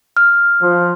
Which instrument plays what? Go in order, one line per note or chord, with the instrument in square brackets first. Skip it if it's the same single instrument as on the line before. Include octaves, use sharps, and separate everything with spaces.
[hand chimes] F6
[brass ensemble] F3